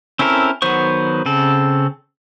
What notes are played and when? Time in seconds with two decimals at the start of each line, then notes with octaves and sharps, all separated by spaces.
0.19 C4 C#4 E4 A4 A#4
0.62 D#3 F#3 B3 C5 C#6
1.26 C#3 C4 A4